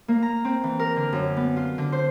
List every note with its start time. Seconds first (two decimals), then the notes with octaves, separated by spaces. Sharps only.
0.08 A#3
0.22 A#5
0.45 C4
0.64 E3
0.79 A#4
0.96 D3
1.12 F#2
1.37 B3
1.56 F4
1.78 D3
1.92 C5